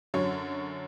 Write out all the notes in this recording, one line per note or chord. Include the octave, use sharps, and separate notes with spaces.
F#2 D3 F#3 C#4 C#5